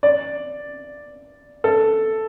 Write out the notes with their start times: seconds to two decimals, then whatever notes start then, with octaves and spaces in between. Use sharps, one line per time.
0.03 D5
1.64 A4